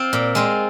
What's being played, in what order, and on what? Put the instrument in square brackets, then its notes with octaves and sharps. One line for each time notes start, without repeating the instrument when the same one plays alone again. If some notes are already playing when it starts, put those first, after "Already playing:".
Already playing: [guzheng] C4 F4
A#2
G#3 C4 F4